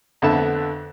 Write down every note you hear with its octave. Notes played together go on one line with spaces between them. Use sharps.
F2 D3 A3 B3 E5 A5